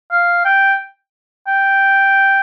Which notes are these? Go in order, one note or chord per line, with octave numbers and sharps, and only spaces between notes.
F5
G5
G5